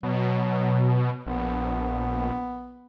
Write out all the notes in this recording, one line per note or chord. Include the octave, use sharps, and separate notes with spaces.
B2 F#3
A#1 B3